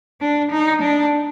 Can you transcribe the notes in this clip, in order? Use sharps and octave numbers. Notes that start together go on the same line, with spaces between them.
D4
D#4
D4